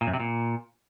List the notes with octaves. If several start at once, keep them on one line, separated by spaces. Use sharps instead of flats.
A#2
F#2
C3
A#2